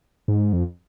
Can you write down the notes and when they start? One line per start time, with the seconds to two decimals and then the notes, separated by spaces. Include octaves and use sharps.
0.28 G#2
0.53 F2